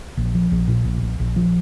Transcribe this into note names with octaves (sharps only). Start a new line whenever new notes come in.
A#1
F3
A#1
A#2
A#1
A#1
A#1
F3